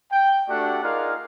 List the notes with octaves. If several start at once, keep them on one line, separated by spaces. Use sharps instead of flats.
G5
A3 D4 F#4 G4 D5 F#5
D#4 F4 G#4 A#4 D5 F5